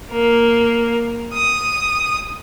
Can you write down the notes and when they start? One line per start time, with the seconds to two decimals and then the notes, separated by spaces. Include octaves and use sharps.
0.12 A#3
1.34 D#6